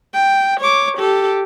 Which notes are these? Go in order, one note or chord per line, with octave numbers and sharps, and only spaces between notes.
G5
C#5 D6
G4 A4